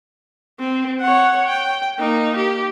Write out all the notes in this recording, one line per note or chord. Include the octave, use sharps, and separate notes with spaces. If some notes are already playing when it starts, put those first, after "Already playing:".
C4
C#5 F#5
G5
A#3 D#4
G4